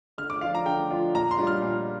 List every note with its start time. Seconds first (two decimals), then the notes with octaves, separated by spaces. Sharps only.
0.18 D3 F6
0.30 D6
0.41 F3 D4 F4 F5
0.55 A#5
0.65 D3 G5
0.91 F3 D4 F4
1.14 A#2 A#5
1.31 C6
1.38 G3 D4 F4
1.47 F6
1.62 A#2